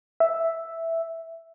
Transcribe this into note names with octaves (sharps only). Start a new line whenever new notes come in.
E5